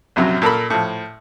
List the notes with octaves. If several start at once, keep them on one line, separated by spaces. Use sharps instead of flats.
A#1 F#2 C3 F#3
A#2 A4 A#4 B5
A2 F3